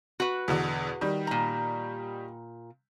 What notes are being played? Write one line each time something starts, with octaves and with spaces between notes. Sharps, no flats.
F#4 B4
E2 B2 D3
D#3 G3
A#2 A#5